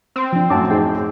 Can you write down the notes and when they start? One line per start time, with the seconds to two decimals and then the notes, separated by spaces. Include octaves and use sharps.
0.16 C4
0.33 F3 D4
0.50 F#2 A2 F#5 A5 D6
0.70 D#4 G#4 G5